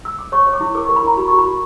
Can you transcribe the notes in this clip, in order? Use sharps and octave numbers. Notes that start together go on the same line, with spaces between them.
E6
D6
C#5 C#6
C#5
D6
E4
A#4 D6
C#6
A#4
B5
E4 A#5
F#4 B5
F#4 C#6
B5
F#4